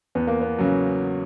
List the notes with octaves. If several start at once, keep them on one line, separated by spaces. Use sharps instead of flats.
E2 B3
A#3
B3
C#3 F#3